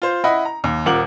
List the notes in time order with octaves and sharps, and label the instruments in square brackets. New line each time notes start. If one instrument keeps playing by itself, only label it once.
[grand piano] F4 C5
E4 D#5 F#5 B5
A#5
D#2
D#1 F4 A#4 F#5 D6 F#7